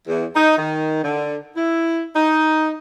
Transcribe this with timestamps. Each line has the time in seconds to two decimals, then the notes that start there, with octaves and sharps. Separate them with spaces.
0.08 E2
0.35 D#4
0.57 D#3
1.03 D3
1.56 E4
2.16 D#4